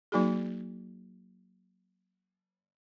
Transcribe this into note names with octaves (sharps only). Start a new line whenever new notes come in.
F#3 A#3 D#4 F#4 G#4